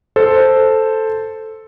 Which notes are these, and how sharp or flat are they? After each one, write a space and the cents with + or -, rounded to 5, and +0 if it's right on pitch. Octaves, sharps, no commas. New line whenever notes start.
A4 +0 C5 +0